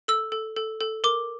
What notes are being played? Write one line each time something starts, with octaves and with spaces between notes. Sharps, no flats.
A4 E6
A4
A4
A4
A#4 D6